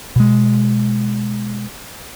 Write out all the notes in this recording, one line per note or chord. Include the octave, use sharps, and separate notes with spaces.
B2 G#3